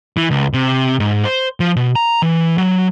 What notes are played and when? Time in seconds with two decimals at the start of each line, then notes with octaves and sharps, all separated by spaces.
0.17 E3
0.31 C#2
0.54 C3
1.00 G#2
1.25 C5
1.60 F3
1.76 B2
1.96 A#5
2.22 E3
2.58 F#3